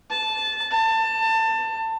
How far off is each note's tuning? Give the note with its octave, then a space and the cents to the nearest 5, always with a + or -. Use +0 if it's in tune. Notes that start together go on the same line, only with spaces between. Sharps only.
A5 -15
A5 +25